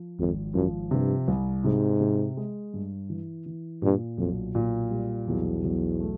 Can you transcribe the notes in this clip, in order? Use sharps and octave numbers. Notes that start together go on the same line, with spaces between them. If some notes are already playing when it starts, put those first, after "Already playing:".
Already playing: F3
G#1 F2
F#2 F3
G2 C3
C2
G#2 C3
C3
G#3
G2
E3
E3
G2 A#2
B1 F2
A#2
G3
B1 E2
B1
A3